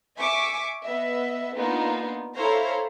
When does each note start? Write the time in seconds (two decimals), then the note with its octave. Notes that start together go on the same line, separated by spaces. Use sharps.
0.18 E5 G#5 C#6 D6 B6
0.84 B3 D#5 E5
1.56 A#3 B3 D4 D#4 F4
2.37 E4 A4 C5 C#5 F5 A#5